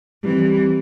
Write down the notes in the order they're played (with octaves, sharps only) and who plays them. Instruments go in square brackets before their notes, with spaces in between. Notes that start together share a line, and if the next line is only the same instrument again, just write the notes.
[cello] E3 C4 [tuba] G3